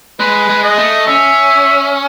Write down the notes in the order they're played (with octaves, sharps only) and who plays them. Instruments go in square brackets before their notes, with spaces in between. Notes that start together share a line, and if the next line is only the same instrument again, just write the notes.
[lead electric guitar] G#3 [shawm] B4
[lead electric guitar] G#3
[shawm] D#5
[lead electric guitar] A3
[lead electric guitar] C#4 [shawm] E5